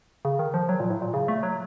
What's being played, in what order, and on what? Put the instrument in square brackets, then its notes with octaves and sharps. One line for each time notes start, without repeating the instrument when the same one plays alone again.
[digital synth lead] C#3
D#3
F3
F#3
A#2
A2
A#2
C#3
A3
F#3